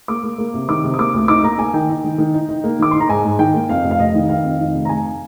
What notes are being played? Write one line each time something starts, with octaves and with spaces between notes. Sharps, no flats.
A#3 D6
A#3
A#3
C3
D#3 D6
C3
D#6
A#3 D6
D2
D#4 D6
A#3 A#5
A#3 G#5
D#3 G5
D#4
D#3
D#3
D#4
D#4
A#3
D#3 D6
D#4 C6
A#5
G#2 G#5
G#2
D#3 G5
A#3
F2 F5
F1
F5
F1 D#5
D#3
D#3 F5
F2
D#3
F1
A#5
F1 G#5